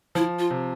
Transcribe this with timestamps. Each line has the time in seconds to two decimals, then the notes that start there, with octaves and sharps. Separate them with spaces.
0.15 F3 E4
0.39 F4
0.51 C3